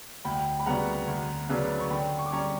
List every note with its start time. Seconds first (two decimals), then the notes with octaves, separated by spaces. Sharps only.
0.25 D2 G5 B5
0.59 B5
0.66 C#3 G3 B3 F#4 F#5 A#5
1.07 D2
1.49 C#3 F#3 B3 D4
1.80 C#6
1.90 D3 G5 B5
2.18 C#6
2.26 D6
2.32 G3 C#4 A#5 C#6